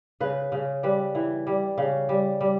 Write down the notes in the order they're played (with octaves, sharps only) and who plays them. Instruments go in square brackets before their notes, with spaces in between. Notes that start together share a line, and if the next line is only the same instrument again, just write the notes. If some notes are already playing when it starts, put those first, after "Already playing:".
[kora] C#3 B4
C#3
G3 B4
E3
G3
C#3
G3
G3